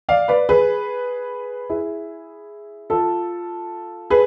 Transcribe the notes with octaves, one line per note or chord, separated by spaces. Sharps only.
D5 F5
B4 D5
G#4 B4
E4 G#4
F4 A4
G#4 B4